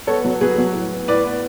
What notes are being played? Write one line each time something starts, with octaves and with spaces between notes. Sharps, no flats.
B3 A4 C#5
F#3
F#3 G#4 B4
F#3
A2
B3
A2 B4 D5
B3